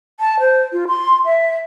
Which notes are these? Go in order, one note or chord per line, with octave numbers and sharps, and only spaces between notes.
A5
C5
F4
C6
E5